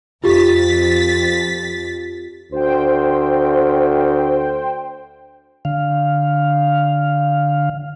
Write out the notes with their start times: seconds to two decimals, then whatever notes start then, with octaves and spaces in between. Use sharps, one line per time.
0.24 F2 F4 G4 A6 B6
2.52 D2 C5 G5
5.65 D3 F5